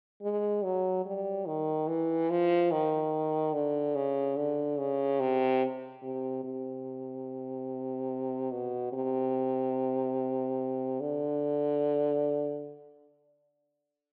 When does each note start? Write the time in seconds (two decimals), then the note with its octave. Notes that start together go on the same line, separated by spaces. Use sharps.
0.22 G#3
0.64 F#3
1.05 G3
1.47 D#3
1.88 E3
2.30 F3
2.71 D#3
3.54 D3
3.95 C#3
4.36 D3
4.78 C#3
5.20 C3
6.03 C3
6.44 C3
8.51 B2
8.93 C3
11.01 D3